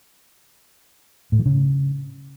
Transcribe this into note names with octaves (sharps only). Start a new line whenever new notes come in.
A2
E3
C#3